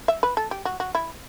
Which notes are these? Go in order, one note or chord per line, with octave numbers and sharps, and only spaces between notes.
E5
B4
A4
G4
F#4
F#4
E4